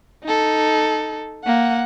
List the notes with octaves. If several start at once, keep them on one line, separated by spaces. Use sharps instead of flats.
D#4 A4
A#3 F#5